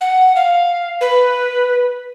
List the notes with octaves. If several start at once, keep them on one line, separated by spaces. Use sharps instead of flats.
F#5
F5
B4